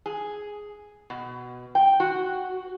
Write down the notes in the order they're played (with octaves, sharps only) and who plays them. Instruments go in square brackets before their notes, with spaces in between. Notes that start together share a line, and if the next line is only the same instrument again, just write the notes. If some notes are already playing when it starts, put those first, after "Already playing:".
[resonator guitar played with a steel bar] G#4
B2
G5
F#4